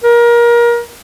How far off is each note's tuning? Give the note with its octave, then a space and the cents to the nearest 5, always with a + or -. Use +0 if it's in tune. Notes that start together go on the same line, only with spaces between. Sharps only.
A#4 +25